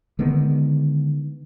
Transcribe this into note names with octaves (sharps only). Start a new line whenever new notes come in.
D3 D#3 G#3 B3